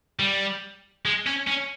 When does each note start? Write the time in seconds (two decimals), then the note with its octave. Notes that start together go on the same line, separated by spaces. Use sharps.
0.19 G3
1.06 G#3
1.27 C#4
1.48 C#4